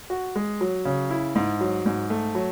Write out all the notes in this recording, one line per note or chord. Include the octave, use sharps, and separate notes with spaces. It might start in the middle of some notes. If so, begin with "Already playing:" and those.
F#4
G#3
F#3
C#3
E4
G#2
F#3
G#2
A3
F#3